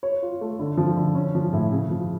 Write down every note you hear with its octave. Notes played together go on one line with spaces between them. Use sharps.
C#5
F4
A3
D3
F3
D3
C#4
F3
A2
C#3
F3